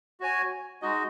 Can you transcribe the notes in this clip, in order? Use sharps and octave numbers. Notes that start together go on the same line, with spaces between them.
F#4 C#5 G#5
G#3 D#4 F#4 D#5